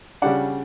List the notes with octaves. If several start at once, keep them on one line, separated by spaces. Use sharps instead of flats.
C#3 G3 D4 D5 F#5